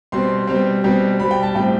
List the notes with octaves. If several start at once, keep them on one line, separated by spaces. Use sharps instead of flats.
B2 G3 C4 C6
B2 G3 C4
B2 G3 C4
B2 G3 C4 B5
G5
A5
A2 G3 C4 G5